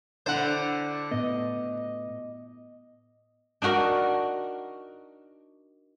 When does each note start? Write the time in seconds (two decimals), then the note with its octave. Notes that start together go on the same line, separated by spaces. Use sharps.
0.26 D3 D4 E4 C5 F#5
1.11 A2 B3 D#5
3.62 D4 D#4 F#4 A#4